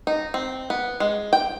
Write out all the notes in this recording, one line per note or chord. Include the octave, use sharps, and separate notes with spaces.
D#4
C4
B3
G#3
G5